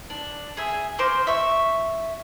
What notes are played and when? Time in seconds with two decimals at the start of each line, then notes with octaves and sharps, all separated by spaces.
0.10 D4
0.57 G#4 E5
0.99 A#4 C5 C6 D6
1.27 E5 C#6